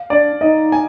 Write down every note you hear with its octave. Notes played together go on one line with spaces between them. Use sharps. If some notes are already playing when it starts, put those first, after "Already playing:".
Already playing: F5
D4 D5
D#4 D#5
G#5